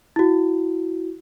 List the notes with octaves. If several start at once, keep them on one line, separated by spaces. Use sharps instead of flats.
E4 F#4